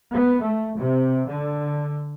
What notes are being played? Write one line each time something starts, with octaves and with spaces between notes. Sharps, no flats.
B3
A3
C3
D3